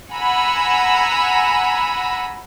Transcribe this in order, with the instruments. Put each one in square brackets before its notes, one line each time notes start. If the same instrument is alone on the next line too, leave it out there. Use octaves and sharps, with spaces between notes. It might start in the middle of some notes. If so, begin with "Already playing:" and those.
[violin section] F#5 G#5 A#5 B5 E6